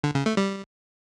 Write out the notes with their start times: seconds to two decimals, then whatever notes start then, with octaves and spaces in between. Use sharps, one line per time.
0.04 D3
0.15 C#3
0.26 A3
0.37 G3